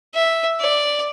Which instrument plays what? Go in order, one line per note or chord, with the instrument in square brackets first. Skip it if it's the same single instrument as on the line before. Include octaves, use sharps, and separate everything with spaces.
[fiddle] E5
D5